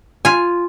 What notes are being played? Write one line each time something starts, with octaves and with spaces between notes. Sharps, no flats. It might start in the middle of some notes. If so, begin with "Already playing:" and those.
F4 G#5